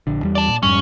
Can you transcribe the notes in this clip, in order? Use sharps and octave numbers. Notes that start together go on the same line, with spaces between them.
A#1 D3
E2 G3
D5 A5
A#2
F2 G#2 G3 C#4